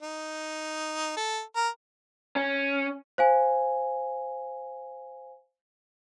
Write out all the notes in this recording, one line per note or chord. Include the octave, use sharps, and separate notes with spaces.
D#4
A4
A#4
C#4
C5 F5 G#5